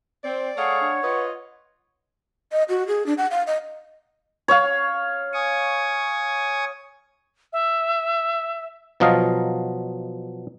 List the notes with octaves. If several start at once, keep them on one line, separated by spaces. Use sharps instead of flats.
C4 D5
A3 G#4 C#5 F5 F#5
D4
F4 B4 D#5
D#5
F#4
G#4
D4
F#5
F5
D#5
C#5 F5
G#5 C#6 D#6
E5
B2 F3 F#3 D#5 F5